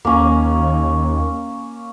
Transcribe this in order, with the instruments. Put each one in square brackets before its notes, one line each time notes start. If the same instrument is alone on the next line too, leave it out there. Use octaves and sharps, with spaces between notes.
[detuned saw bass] D#2 [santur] A#3 C#4